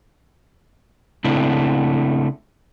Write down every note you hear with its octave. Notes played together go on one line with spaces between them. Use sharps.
C#3 A3 C4 D4 E4